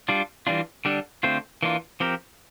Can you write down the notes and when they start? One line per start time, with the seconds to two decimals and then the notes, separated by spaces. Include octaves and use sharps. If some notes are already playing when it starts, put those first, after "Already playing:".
0.08 G3 D4 F4
0.47 E3 G3 D4 F4
0.85 D3 G3 D4 A4
1.23 D3 A3 C4 F4 C5
1.63 E3 A#3 D4 F4
2.00 F3 C4 G4 A#4